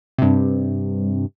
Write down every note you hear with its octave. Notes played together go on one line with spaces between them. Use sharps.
G2 C3